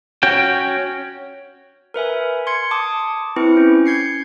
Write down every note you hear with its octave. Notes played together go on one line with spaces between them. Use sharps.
C#4 F#4 G5
A#4 B4 E5 G#5
C6 G#6 C#7
A5 D6 D#6
C4 E4 B4 C#7
C#4
G6 G#6 C7 C#7